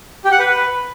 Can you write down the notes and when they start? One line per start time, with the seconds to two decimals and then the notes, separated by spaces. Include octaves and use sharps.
0.25 G4
0.32 F#5
0.39 B4